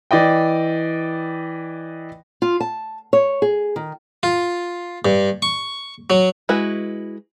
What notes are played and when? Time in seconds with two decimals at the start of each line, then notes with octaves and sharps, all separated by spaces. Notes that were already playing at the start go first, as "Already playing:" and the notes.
0.11 E3 D5 D#5 G5
2.42 F4
2.61 A5
3.13 C#5
3.42 G#4
3.76 D#3
4.23 F4
5.05 G2
5.42 C#6
6.10 F#3
6.49 G#3 E4 F#4 B4